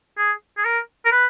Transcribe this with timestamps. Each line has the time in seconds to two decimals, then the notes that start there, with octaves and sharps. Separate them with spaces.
0.18 G#4
0.58 G#4
0.65 A#4
1.05 A#4
1.12 B4